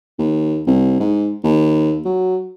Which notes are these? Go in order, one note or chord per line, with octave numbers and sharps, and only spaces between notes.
D#2
C2
G#2
D#2
F#3